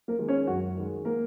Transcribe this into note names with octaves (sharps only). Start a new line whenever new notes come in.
A#3 A#4
D#3 G#3
C#4 C#5
F#2 F#4
D#3 G#3
A#3 A#4